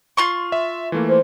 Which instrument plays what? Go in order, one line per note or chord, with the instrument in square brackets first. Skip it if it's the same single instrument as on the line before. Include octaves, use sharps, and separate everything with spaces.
[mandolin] F4 C6 C#6
[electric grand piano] E5
E3 A3 A#3
[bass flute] C5